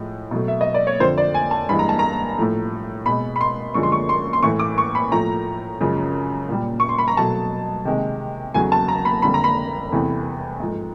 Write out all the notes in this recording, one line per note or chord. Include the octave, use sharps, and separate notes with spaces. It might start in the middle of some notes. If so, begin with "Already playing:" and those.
Already playing: A2 F3 G#3
B2 F#3 A3
E5
D#5
D5
C#5
F2 D3 F3 C5
D5
G#5
A5
G2 E3 G#3 B5
A#5
A5
A#5
A2 F3 A3
B2 G#3 B5
B5
C6
F#2 D3 F3 G#3 C#6
C6
C#6
C6
C6
A2 E3 A3 C#6
D6
C#6
B5
A2 F3 A3 A#5
F#2 C#3 F3 G#3
A#2 G3
C#6
C6
B5
A#5
B2 F#3 A3 A5
C3 D#3 G#3
E2 C#3 F#3 A3 G#5
A5
A#5
B5
F2 D3 G3 B5
A#5
B5
E2 C3 E3 A3
G#2 F3 A3